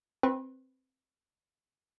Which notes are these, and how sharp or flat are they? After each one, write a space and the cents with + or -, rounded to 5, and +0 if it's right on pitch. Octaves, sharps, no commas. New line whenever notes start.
C4 +0 B4 +0 C6 +45